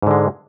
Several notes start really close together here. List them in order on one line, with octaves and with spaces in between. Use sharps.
G#2 D3 G#3